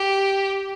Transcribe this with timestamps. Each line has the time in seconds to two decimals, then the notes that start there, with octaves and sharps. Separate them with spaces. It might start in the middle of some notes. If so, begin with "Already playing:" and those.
Already playing: G4